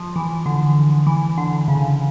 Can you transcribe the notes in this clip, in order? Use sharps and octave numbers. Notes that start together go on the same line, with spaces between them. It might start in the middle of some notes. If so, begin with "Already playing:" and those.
Already playing: F3
E3
D3
E3
D3
C#3